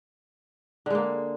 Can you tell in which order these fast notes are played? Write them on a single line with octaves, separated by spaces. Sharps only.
D3 G#3 A#3